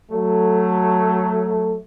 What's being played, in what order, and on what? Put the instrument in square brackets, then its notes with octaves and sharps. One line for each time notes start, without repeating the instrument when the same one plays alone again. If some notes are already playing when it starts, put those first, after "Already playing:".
[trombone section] F#3 A3